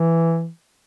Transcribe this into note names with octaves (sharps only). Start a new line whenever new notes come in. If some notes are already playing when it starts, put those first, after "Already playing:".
Already playing: E3